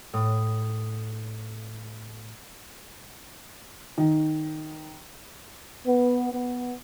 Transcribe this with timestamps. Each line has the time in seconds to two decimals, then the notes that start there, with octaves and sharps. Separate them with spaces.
0.13 A2 D#6
3.98 D#3
5.86 B3
6.32 B3